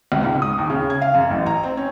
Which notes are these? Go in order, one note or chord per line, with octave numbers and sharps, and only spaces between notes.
C#2
G#2
D#6
D#2
C#3
G#6
F5
F#2
A1
A#5
C4
C#4